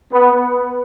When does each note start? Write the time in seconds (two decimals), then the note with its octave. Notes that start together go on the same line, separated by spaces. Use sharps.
0.11 B3